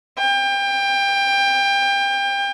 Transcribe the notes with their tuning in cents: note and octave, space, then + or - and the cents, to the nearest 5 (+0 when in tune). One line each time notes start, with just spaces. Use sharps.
G5 +25